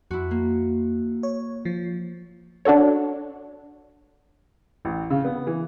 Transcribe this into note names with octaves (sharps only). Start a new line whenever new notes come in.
F2 E4 F#4
A#3
C#5
F3
D4 F#4 A4 C#5
A1
C#3
B3
E3